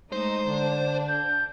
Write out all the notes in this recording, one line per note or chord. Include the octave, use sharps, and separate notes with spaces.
G#3 A3 D#4 C5
D3 D4
G6